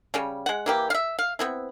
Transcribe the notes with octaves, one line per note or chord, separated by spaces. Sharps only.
C#3 G3 C#4
G#3 F#5
E3 A#3 G4
E5 F5
F5
B3 C4 E4